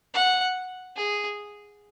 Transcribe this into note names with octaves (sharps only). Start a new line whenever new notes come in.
F#5
G#4